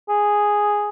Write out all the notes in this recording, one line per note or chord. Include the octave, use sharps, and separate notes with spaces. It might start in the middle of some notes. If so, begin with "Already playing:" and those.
G#4